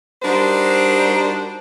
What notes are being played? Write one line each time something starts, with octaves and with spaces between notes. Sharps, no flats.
G3 D4 D#4 F#4 A#4 C5